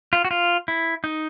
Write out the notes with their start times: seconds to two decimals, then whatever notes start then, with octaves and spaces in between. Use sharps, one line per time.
0.13 F4
0.25 F#4
0.31 F4
0.68 E4
1.04 D#4